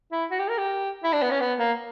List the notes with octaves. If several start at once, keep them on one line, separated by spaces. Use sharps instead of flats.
E4
F#4
G4
A#4
G4
E4
D4
B3
C#4
B3
A#3